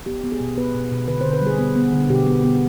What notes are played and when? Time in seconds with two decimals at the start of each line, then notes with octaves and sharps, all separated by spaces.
0.06 B3 G4
0.24 B3
0.32 G#4
0.40 B2
0.57 B3 B4
0.74 B2
0.91 B2
1.08 D3 B4
1.21 C5
1.25 D3
1.33 B4
1.42 G3 G#4
1.59 B3
1.76 B3
1.93 D3
2.10 B2 G4
2.27 B3
2.44 B3